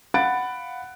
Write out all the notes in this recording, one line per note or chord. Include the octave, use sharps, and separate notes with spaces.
F5 F#5 B5 F#6 A6 D7